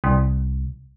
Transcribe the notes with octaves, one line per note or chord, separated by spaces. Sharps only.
C2